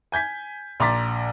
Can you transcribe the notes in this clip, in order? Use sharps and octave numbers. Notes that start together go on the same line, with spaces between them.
G#5 G6 G#6 B6
A#1 A#5 C6 D6 A6 B6